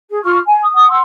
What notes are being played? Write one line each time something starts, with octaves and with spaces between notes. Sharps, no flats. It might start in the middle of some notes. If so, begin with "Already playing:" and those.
G#4
F4 C#6 F6
G#5
D#6
F#5 D#6
F#5 C6 E6